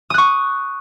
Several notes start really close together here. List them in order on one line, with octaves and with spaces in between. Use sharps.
D#6 F#6 C#6